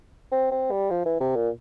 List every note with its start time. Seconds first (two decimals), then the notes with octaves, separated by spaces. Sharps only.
0.31 C4
0.51 C4
0.71 G3
0.90 F3
1.05 E3
1.20 C3
1.36 A#2